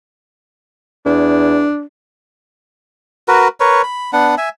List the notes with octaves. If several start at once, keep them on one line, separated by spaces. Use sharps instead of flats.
E2 D4
F#4 A#4 B4
A#4 B4 C#5
B5
B3 D4 F#5
E5 G#5